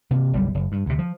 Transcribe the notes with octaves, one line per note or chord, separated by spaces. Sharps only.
C3 A#3
F#1 B1 B2 G3
F#1
G2
D2 C3
F3